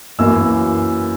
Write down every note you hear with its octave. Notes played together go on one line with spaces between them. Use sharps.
F#2 E3 A#3 E6